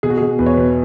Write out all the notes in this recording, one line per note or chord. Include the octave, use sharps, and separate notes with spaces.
B2 G#4
F#4
B2 G#4
E2 B4
C#5
B2 B4